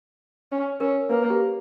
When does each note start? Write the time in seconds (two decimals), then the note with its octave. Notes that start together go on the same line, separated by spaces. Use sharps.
0.52 C#4
0.80 C#4 A#4
1.10 A#3 B4
1.30 G4